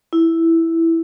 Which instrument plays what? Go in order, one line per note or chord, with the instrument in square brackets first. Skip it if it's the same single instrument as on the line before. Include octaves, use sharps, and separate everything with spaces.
[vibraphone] E4